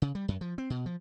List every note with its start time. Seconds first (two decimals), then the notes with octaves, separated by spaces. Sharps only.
0.02 C#3
0.15 G3
0.28 F#2
0.41 F3
0.58 C4
0.70 B2
0.86 F3